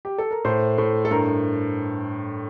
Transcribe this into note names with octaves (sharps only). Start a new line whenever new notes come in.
G4
A4
A#4
A2 C5
A2
A4
G2 A#4